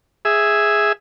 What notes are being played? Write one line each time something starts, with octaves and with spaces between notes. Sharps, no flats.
G#4 E5